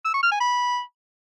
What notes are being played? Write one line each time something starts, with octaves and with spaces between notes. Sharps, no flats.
E6
C#6
F6
G#5
B5